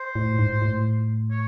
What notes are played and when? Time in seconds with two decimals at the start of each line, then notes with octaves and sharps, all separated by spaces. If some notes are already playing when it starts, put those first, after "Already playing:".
Already playing: C5
0.15 A2
0.39 G#2
0.62 A2
1.31 C#5